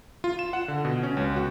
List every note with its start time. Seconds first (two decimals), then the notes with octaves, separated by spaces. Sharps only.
0.24 F4
0.39 E7
0.53 F#5
0.68 D3
0.85 B2
1.03 C#4
1.17 C#2
1.36 F#4